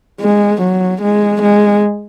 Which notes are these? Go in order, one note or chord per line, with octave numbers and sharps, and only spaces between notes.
G#3
F#3
G#3
G#3